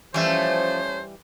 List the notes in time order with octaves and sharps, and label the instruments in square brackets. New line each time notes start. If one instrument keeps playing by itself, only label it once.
[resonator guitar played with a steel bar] E3 G3 E5 [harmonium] F3 [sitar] A3 C#4 [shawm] C5